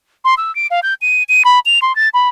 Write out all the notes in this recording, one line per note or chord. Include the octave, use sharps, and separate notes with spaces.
C6
E6
D7
F5
G6
D#7
D#7
B5
F7
C6
A6
B5